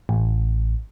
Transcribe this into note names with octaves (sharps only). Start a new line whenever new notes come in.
A1